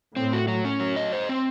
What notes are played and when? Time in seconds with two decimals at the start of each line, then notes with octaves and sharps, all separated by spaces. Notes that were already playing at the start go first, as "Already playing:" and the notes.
0.16 A2 C4
0.33 F#4
0.48 F#3
0.65 C#4
0.80 F#3
0.96 D#5
1.13 C5
1.29 C4